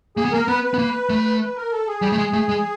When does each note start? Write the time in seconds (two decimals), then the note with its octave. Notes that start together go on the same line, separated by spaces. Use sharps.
0.17 A#3 G#4
0.25 B3
0.32 A#3 A#4
0.48 B3 B4
0.64 B4
0.74 B3
0.78 A#3
1.10 A3
1.41 B4
1.56 A#4
1.72 A4
1.87 G#4
2.02 G3
2.12 A3
2.18 G#3
2.33 A3
2.49 G#3